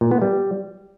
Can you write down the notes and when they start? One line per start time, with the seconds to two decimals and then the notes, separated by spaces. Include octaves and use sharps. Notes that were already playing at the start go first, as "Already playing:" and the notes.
0.01 A#2
0.11 B3
0.22 G3